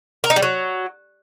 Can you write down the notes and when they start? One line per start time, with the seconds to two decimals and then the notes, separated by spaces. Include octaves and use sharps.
0.24 A#4
0.30 D#4
0.36 G3
0.42 F#3